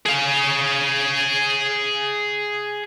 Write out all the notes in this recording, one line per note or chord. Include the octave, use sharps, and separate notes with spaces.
G#4 F5